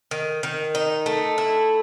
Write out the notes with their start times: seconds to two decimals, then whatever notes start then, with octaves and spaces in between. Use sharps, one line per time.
0.11 D#3
0.43 D#3
0.75 D#4
1.06 A3
1.38 E4